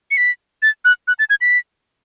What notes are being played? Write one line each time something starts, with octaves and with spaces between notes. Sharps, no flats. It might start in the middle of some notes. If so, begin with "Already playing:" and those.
C#7
B6
A6
F#6
F#6
A6
G#6
B6